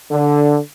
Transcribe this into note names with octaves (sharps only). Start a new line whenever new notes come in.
D3